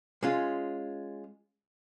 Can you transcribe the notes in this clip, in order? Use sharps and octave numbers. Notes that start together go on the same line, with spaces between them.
G#3 C#4 F4